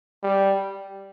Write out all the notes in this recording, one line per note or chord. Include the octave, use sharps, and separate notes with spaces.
G3